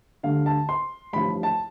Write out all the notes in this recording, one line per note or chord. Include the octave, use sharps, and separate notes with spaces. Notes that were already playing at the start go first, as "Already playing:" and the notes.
D2 D3 G3 F5
A5
C6
A1 G2 F3 B5
A5